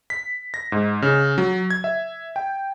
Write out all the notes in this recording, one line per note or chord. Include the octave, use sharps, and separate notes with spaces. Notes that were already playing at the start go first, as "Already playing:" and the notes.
B6
A#6
G#2
C#3
F#3
G#6
E5
G5